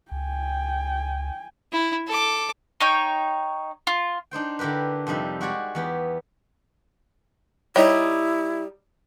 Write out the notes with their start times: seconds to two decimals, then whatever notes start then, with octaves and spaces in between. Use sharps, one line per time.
0.12 C#2 G5 G#5
1.72 E4
2.07 A4 D6
2.80 D#4 C#5 G5
3.87 F4
4.31 D4 D#4 C5 G5
4.59 D3 E4 G4 A#4 B4
5.07 F2 C3 G3 D#4 E5
5.41 G#3 F#4 G4 C#5 D5
5.75 E2 B3 G4
7.76 G3 D#4 E4 C#5